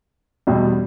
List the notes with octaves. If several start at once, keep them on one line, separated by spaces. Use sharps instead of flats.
E2 B2 G3